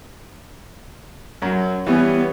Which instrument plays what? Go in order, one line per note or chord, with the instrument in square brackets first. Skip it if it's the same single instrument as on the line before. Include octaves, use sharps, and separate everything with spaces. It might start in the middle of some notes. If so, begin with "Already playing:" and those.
[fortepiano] F#2 F#3
[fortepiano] E3 G3 C#4 [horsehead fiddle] B3